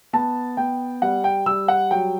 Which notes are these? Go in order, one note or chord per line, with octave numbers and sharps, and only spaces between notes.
B3 A5
B3 G5
G3 F#5
G5
G3 E6
F#5
F#3 G5